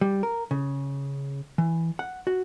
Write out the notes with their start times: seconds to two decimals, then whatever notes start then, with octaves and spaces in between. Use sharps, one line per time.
0.01 G3
0.23 A#4
0.51 C#3
1.58 E3
1.99 F#5
2.27 F#4